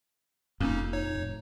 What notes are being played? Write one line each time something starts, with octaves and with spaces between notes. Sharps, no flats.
F1 F2 A#2 A#3 C#4 D#4
D#4 C#5
F1 A2